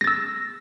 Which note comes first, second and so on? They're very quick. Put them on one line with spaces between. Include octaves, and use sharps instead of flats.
A#6 A6 E6